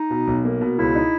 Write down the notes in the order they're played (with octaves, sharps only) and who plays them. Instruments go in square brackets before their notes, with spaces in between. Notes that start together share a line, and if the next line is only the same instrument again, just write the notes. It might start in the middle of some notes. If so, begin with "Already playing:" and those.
Already playing: [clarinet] D#4
[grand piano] B2
B1
A#3
B2
[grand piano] C#2 [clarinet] E4
[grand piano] D#4